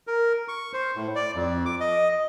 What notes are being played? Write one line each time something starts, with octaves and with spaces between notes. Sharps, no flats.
A#4
C#6
C5
A2
D5
F2
D6
D#5